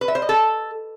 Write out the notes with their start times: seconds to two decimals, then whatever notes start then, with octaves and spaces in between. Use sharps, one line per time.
0.01 B4
0.08 E5
0.15 C5
0.22 D#5
0.29 A4